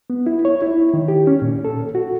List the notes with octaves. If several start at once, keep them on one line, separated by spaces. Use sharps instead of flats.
B3
E4
C#5
E4
D#3
G4
C#4
A#2
A4
F#4